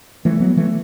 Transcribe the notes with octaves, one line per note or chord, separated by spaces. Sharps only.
E3 A3
F#3 B3
E3 A3